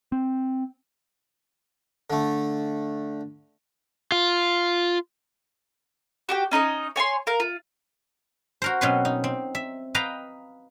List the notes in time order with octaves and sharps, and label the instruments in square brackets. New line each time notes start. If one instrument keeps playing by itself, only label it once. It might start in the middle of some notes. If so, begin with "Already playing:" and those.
[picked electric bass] C4
[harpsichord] D3 A3
[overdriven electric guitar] F4
[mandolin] F#4 G4 G5
C#4 D#4 A4 D#5
C#5 G#5 A5 C6
A#4 F5
F4
[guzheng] F#4 A#4 C5
B2 F#3 C4 C#4 B4 C6
D#4
C4
E5
B4 D#5 F5 G5 A#5